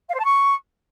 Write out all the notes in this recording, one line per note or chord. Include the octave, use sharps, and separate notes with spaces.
F5
C5
A5
C#6